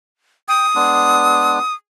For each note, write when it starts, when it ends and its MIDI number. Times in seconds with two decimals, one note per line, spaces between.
0.48 0.66 79
0.48 1.74 87
0.75 1.59 56
0.75 1.59 59
0.75 1.59 62